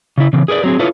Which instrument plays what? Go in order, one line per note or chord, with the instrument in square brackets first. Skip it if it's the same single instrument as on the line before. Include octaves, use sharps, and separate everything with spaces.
[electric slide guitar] C#3 E4
C#3 E3 C4
G#4 A#4 B4 D5
F#3 C4 G#4
E4 F4 A4 B4 C#5